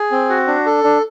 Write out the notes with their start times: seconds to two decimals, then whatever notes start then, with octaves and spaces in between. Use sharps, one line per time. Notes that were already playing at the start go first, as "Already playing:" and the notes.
Already playing: G#4
0.12 C4
0.29 F#4
0.47 D4
0.66 A4
0.84 D4